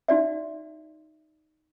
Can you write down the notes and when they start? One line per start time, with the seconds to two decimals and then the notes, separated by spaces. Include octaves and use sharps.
0.08 D#4 F#4 D5 E5